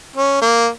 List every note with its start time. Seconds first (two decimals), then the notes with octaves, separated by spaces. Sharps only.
0.16 C#4
0.42 A#3